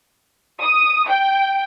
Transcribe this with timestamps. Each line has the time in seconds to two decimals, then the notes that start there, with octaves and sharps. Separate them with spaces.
0.61 D#6
1.09 G5